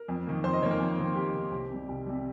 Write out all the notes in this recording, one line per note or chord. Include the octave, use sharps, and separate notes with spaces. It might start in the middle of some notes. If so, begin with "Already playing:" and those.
Already playing: A#4
F2
D#3 A#3
F2 C5
D#5
D#3 A#3 C#5
A#4
F2
D#3 A#3
F2 G4
D#3 A#3
C2
C3 G3
C2
C3 G3